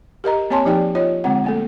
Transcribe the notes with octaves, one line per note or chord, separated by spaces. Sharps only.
G4 A#4 D#5 A#5
A#3 C4 C#5 G#5 A5 C6
F3 D#4 G4 D5 G5
F4 C#5 D#5
D3 G#3 C4 F#5
A3 A#3 A4